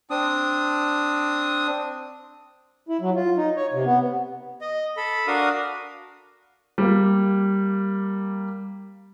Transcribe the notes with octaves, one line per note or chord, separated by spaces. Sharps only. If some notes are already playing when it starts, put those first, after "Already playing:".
C4 D4 D#6
E4
F#3
F4
D#4
C#5
C3
B3
D#5
A4 B5
D4 F#4 A#4 F5 D#6
G3 A#3